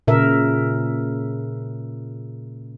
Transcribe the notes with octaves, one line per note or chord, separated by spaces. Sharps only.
A#2 C#3 A#4 E5